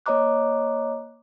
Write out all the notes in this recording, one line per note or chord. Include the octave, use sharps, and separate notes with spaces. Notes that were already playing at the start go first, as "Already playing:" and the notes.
A#3 C#5 D#5 A#5 D6 F#6